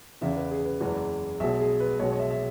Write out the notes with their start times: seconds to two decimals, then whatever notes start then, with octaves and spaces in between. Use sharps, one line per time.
0.21 E2 C#3 E3 E5
0.36 B4
0.51 G#4
0.65 B4
0.81 F#1 E2 E3 G#3
1.40 B1 B2 G#3 E5
1.60 G#4
1.80 B4
2.00 B1 B2 G#3 C#5
2.12 C#5
2.20 E5
2.31 E5